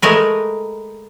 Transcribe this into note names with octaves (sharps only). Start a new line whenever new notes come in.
G#3 A3 A#4 B4